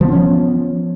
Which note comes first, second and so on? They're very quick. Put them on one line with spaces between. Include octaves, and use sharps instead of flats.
F3 B3 D4 C#4